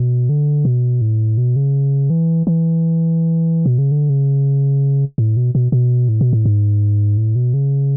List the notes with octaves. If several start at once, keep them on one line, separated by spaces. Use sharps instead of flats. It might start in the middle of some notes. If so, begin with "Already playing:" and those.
Already playing: B2
D3
B2
A2
B2
C#3
E3
E3
B2
C#3
D3
C#3
A2
B2
B2
B2
A2
B2
A2
G#2
A2
B2
C#3